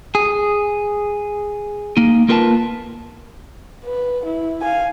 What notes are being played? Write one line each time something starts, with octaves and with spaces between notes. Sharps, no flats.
G#4
A#3 D#4
A#3 F4 A#4 B4 F#5 A5
B4
E4
F5 G#5